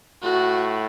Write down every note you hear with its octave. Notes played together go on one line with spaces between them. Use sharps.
A2 F#4